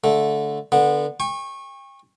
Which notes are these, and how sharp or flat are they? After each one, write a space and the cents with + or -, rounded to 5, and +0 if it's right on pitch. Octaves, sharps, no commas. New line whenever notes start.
D3 -10 A3 -10
D3 +0 B3 -20
G5 +40 C#6 -20